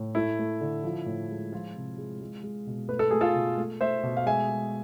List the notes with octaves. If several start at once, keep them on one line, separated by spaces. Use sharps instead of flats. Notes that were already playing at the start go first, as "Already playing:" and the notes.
Already playing: A2
A3 E4
A3
D3
F3
A2
G#3
F3 F4
C3
G#3
G#3
G#3
B2
A3 B4
A4
A3 G#4
F4 A4
B2
A3
A3 C5 E5
B2
F5
G#3 E5 G#5
G#3